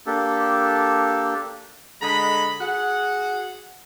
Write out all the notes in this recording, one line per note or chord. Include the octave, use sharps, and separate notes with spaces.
A#3 D4 G4 A4
D3 G#3 D#5 A#5 B5
F#4 G#4 F#5